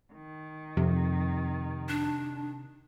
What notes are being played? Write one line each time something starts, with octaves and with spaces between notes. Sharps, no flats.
D#3
F2 C3
D4